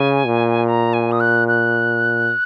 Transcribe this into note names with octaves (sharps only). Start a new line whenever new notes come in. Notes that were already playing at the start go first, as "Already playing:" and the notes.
Already playing: C#3 G#5
A#2
A#5
G#5
D#6
F#6
F#6